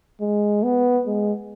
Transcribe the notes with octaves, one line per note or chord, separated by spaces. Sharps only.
G#3
B3
G#3